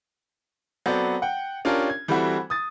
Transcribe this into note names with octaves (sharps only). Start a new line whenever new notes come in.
F#3 B3 C4 A4 C5 D5
F#5 G5
C#4 D4 F4 G4 A#4
G#6
E3 G3 A3 C4 E4 F#4
D#6 A6